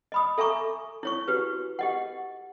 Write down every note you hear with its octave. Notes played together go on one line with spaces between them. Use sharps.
D#5 B5 D#6
A4 E5 G#5 A#5 C#6 D6
E4 C#5 C#6
F#4 G4 B4
G4 D#5 F#5